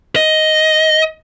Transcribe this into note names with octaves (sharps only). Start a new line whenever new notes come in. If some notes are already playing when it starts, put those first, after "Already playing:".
D#5